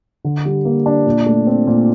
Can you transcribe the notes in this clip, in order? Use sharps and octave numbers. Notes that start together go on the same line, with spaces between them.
D3
G3
A#3
D4
A#2
A3
C4
A#2